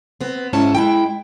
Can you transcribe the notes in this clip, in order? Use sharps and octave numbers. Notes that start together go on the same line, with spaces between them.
B3 C4
G#2 C#4 E4 A5
G#3 E4 G5